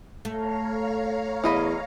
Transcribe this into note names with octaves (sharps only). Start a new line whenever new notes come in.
A3 C#5 F5 A#5
E2 E3 D#5 B5